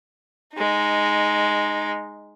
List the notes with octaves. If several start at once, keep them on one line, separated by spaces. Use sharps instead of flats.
G#3 D#4